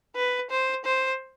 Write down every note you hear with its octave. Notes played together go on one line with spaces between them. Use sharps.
B4
C5
C5